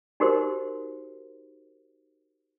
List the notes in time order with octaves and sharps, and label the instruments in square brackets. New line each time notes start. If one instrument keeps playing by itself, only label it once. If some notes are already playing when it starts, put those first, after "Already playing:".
[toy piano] D#4 F#4 G4 A#4 C5